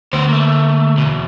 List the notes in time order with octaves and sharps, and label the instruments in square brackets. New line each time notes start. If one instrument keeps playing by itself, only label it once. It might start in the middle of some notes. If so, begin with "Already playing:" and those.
[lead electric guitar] D2 [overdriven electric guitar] B3 C5
[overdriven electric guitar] A3 A#3
E2 B2